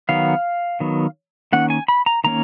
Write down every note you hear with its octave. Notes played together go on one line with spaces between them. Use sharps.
D#3 F#3 B3 F5
D#3 F#3 B3
D#3 A#3 C#4 F#5
G#5
B5
A#5
D#3 A#3 C#4 A#5